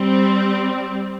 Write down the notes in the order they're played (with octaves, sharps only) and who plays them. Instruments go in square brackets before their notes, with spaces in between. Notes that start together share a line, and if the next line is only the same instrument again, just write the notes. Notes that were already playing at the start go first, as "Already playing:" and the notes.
Already playing: [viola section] G3 C4